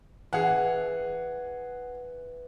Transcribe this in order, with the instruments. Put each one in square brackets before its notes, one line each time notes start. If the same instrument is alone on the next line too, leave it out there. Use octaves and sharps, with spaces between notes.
[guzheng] E3 [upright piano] G#4 F#5